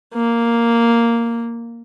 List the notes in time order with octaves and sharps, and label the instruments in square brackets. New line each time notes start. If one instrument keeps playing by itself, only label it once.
[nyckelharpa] A#3